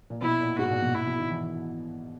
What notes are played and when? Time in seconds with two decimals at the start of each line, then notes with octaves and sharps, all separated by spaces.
0.10 A#2
0.22 B2 E4
0.40 A#2
0.58 G#2 F#4
0.71 A#2
0.82 B2
0.94 B2 E4
1.07 B2
1.19 D#3
1.31 E3